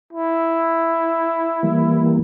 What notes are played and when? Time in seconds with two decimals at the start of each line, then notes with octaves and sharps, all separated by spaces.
0.13 E4
1.63 E3 G3 A#3